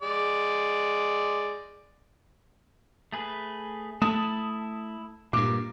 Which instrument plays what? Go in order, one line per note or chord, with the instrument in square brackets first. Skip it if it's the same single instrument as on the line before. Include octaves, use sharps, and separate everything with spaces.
[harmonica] G#3 D5
[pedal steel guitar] A3 G#4 B4
[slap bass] A3 [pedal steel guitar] E4 A5 [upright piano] D#6
[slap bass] G2 A#2 [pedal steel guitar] A#3 [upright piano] D6